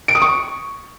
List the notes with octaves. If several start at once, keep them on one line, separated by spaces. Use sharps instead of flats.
D7
D#6
C#6